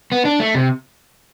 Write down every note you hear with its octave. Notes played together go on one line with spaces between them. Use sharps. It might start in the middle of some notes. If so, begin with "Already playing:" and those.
B3
D4
A3
C3